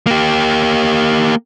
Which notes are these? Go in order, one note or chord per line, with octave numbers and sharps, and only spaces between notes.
A#3 G4